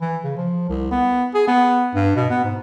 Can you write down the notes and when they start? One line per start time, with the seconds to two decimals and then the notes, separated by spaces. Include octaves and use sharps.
0.01 E3
0.24 C#3
0.37 F3
0.69 C2
0.91 B3
1.34 G#4
1.47 B3
1.95 G2
2.16 B2
2.30 B3
2.44 G#2